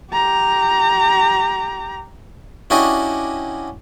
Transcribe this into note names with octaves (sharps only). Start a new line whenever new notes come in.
G4 A#5
C#4 D4 E4 F#4 G4 D#5